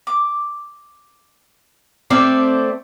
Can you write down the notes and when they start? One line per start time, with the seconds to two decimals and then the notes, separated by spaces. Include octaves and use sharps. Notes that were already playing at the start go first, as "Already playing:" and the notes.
0.07 D6
2.10 A3 C4 D5 D6 F6